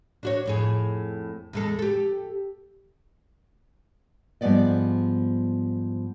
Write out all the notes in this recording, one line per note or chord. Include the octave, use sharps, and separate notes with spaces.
D4 F#4 C#5
F2 A2 G#4
E2 G#3 A4
G4 A4
G#2 F3 G3 B3 D5 D#5